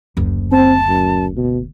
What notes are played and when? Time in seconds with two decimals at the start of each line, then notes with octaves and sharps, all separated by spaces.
0.17 F#1 D2
0.52 C4 A5
0.89 F#2
1.36 B2